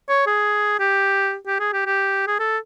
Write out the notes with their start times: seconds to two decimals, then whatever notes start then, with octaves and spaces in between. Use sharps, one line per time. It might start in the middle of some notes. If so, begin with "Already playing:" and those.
0.09 C#5
0.27 G#4
0.79 G4
1.47 G4
1.60 G#4
1.73 G4
1.86 G4
2.27 G#4
2.39 A4